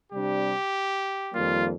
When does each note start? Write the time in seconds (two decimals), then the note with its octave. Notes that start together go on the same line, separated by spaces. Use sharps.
0.12 C3 G3 D4 G4
1.31 F2 D#3 G3 A#3 F4